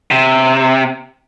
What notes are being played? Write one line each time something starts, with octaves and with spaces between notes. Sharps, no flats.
C3